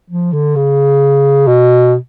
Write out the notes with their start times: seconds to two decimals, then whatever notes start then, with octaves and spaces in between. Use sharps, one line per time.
0.10 F3
0.33 D3
0.56 C#3
1.47 B2